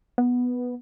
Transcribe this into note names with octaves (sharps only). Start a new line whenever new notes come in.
B3